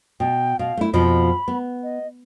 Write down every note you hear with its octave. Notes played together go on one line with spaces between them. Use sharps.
B2 G5
B2 F5
A3 E4
F2 B2 F3 B5
B3
D#5